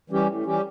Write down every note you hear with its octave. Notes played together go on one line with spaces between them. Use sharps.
E3 G3 C#4 G4
A2
E3 G3 C#4 G4